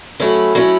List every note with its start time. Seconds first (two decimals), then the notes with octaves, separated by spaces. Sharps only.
0.20 F#3 A3 C#4 E4
0.55 F#3 A3 C#4 E4